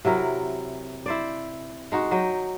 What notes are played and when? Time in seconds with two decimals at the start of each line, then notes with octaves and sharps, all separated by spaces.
0.05 C3 F#3 E4 A#4
1.06 E4 C5 D5
1.92 G#3 D#4 F#4
2.11 F#3 D#5 G5